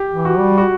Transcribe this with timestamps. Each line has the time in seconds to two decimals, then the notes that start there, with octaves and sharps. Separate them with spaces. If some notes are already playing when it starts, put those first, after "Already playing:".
Already playing: G4
0.11 E3
0.25 F#4
0.39 G3
0.58 F#4